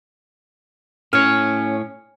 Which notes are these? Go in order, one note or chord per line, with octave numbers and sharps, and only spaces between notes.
A2 C#4 C#5 F6